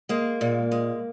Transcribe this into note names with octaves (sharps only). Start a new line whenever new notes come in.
G#3 A#3
A#2
G#3